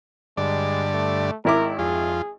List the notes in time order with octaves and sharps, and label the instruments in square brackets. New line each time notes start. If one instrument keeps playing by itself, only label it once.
[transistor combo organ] G2 D3 D5 [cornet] G#3
[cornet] A3
[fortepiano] G#1 E4 D6 [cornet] A#4
[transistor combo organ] F2 F4 [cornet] G#4